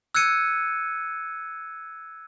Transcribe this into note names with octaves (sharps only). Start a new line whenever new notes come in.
E6 F#6 G#6 C#7 D#7